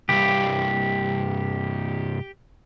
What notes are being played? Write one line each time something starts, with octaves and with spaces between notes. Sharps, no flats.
C2 G2 G4